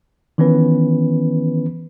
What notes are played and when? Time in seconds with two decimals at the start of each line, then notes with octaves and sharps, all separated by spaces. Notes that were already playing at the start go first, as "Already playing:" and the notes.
0.38 D#3 E3 B3 C#4 B4